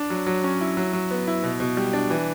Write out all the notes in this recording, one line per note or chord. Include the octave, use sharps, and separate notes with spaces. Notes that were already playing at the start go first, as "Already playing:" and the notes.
Already playing: D4
F#3
F#3
C#4
E4
F#3
F#3
B3
E4
B2
B2
G3
D4
E3